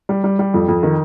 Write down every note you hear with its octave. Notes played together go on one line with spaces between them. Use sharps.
G3
G3
G3
F2
F2
D#3